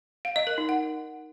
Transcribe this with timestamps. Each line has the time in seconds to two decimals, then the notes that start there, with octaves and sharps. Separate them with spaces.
0.25 F5
0.36 D#5
0.47 A#4
0.58 D#4
0.69 F#5